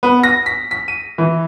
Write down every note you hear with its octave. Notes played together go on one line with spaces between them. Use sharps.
B3
A#6
B6
B6
D#7
E3